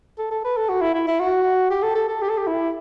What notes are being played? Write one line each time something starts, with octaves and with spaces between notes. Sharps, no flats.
A4
A4
B4
A4
F#4
E4
E4
E4
F#4
G4
A4
A4
A4
G4
A4
G4
E4